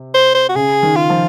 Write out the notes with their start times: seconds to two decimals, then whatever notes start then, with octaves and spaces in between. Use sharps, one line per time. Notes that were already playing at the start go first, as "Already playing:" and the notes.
Already playing: C3
0.14 C5
0.35 C5
0.49 F#4
0.55 C#3 G#4
0.83 D#3
0.96 F4
1.10 F3